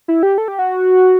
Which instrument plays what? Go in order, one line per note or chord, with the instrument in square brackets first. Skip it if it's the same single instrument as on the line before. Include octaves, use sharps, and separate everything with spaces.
[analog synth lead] E4
G4
A4
G4
F#4